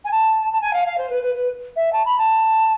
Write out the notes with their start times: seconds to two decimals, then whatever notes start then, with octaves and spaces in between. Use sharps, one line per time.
0.04 G#5
0.11 A5
0.52 A5
0.61 G#5
0.73 F5
0.85 F5
0.97 C5
1.09 B4
1.22 B4
1.34 B4
1.76 E5
1.92 A5
2.05 B5
2.18 A5